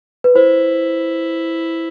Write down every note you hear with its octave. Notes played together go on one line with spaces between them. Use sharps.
B4
E4 C5